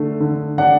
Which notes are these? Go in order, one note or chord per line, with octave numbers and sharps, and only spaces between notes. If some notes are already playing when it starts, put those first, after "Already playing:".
Already playing: D3 A3
D3
D4 F#5